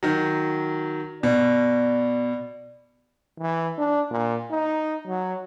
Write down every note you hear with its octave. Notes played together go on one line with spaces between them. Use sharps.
D#3 F#3
B2 D5
E3
D4
A#2
D#4
F#3